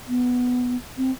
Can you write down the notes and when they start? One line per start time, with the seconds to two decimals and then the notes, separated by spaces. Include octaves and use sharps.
0.08 B3
0.97 C4